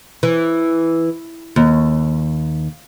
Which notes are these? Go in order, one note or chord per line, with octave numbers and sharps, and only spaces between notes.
E3
D#2